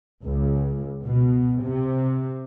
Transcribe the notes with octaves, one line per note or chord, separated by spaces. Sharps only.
C#2
B2
C3